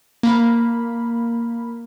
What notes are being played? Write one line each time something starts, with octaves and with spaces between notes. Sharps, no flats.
A#3 B5